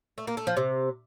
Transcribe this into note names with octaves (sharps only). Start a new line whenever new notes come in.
A3
A#3
A3
F3
C3